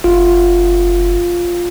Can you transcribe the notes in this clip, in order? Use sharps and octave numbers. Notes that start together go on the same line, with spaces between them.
F#1 F4